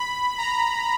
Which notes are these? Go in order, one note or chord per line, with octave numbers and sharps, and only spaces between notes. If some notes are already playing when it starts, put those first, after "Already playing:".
Already playing: B5
A#5